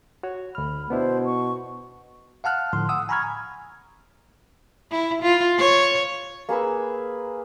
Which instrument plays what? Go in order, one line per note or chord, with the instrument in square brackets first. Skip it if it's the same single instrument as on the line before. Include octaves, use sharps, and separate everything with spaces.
[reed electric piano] F#4 C#5
[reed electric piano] D2 F6 [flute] B5
[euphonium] B2 [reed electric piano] B3 D4 E4 [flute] C5
[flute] C#6
[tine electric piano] F5 F#5 A5 F6 F#6
A2 D3 F3 C6
F#5 D#6 E6
G#5 A#5 B5 C#6 F6 G#6
[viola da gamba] E4
F4
C#5
[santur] A#3 G#4 B4 E6